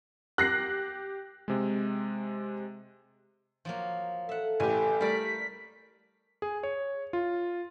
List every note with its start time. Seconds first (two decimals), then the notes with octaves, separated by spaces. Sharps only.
0.38 G4 F#6 A#6 C7
1.48 C3 G#3
3.65 F3 F#3 A#3
4.29 A4 E5 F#5
4.60 A1 G4 G#5
5.01 G3 A3 A#4 D5 B6
6.42 G#4
6.63 C#5
7.13 F4